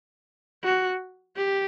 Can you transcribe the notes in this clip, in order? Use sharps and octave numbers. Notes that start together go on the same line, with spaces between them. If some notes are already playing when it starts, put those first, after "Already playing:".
F#4
G4